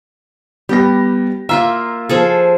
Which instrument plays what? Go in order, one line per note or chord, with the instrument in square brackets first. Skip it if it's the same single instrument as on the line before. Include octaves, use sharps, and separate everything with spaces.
[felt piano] G3 B3 A#6 [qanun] G4
[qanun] A#3 F4 E5 [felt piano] F5 A#5 E6
[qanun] F3 G#4 A4